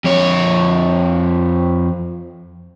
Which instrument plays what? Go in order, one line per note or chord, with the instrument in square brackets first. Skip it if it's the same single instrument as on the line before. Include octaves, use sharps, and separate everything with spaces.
[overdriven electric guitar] F2 C#5